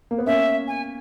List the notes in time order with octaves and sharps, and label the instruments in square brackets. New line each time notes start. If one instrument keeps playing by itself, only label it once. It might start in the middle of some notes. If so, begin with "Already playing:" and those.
[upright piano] A#3
B3
[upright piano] A#3 C#4 [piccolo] E5
[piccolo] G#5